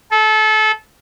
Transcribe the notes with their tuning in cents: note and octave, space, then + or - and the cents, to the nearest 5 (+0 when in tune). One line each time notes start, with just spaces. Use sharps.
A4 -25